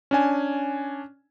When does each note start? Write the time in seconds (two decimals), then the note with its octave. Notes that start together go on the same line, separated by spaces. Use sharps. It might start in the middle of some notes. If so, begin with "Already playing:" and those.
0.11 C#4 D4 G#5